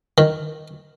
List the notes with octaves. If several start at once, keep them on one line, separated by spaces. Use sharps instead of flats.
D#3